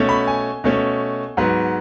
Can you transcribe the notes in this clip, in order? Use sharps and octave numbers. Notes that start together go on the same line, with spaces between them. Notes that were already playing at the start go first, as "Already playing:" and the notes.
Already playing: B2 A3 C#4
B5
G#5
B2 A3 C#4
G#2 F#3 B3